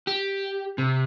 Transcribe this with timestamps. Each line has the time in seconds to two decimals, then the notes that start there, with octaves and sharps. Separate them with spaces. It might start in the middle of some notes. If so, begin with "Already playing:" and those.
0.07 G4
0.78 C3